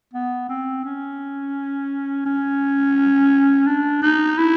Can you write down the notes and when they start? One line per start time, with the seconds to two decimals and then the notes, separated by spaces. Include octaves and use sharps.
0.14 B3
0.49 C4
0.84 C#4
2.26 C#4
3.67 D4
4.02 D#4
4.38 E4